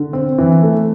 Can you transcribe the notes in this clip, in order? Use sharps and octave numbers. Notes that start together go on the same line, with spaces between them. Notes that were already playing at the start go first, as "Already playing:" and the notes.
Already playing: D3
C4
E3
A3